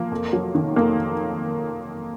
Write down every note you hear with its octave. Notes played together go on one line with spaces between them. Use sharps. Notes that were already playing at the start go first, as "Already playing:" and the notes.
Already playing: F3 A#3
F2
F#3
D#3
F2 A#3